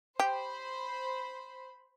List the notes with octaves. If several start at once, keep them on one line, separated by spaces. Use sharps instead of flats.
G4 C5 B5